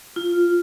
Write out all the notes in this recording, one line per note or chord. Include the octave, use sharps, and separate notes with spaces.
F4